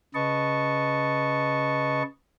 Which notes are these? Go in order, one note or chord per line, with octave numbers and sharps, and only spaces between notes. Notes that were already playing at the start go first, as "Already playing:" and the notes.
C#3 B4 D#5 A5 C#6